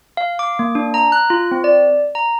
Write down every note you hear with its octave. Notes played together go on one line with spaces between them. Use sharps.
F5
D6
A#3
D4
A#5
F#6
F4
C4
D5
A#5